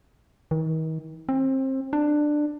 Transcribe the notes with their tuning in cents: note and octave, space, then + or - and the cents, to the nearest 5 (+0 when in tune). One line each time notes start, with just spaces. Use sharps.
D#3 +40
C4 +25
D4 +15